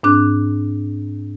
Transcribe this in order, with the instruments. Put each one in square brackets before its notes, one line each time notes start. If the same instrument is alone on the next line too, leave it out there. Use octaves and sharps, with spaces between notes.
[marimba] G#2 C4 D4 D6 F#6